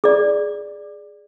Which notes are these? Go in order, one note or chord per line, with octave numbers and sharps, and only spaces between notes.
G#4 D5